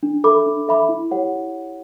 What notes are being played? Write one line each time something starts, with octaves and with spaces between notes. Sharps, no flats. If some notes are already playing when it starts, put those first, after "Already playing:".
D4
A4 E5 B5 D6
D4
A4 E5 B5 D6
E4
G4 C#5 F#5
E4